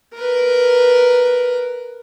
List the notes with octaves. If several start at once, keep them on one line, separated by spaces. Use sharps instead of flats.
A#4 B4